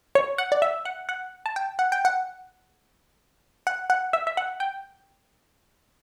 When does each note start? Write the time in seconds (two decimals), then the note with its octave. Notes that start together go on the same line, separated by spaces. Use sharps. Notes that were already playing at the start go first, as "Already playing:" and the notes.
0.15 C#5
0.38 F#5
0.52 D5
0.62 E5
0.85 F#5
1.09 F#5
1.46 A5
1.56 G5
1.79 F#5
1.92 G5
2.05 F#5
3.67 F#5
3.90 F#5
4.13 E5
4.27 E5
4.37 F#5
4.60 G5